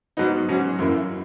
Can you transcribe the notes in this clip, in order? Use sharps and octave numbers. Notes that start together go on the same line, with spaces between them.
G#2 F#3 B3 D#4
G#2 F#3 C#4 F#4
F#2 E3 A#3 E4